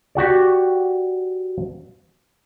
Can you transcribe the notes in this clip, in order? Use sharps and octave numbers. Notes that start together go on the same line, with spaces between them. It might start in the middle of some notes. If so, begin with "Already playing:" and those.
F#4 G4 D5